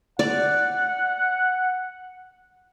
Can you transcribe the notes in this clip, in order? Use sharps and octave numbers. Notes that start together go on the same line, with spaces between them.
D5 F#5